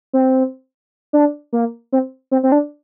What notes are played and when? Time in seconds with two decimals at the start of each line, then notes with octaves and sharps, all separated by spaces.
0.13 C4
1.13 D4
1.53 A#3
1.92 C4
2.31 C4
2.43 C4
2.52 D4